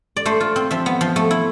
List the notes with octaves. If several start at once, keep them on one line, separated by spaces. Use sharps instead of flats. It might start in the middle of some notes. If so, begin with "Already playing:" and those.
D5
A3 C5
F4
C4
F3 E5
B3
F3
A3
E4